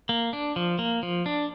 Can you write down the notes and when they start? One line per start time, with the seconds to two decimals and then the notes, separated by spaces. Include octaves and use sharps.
0.09 A#3
0.33 D4
0.56 F3
0.79 A#3
1.03 F3
1.26 D4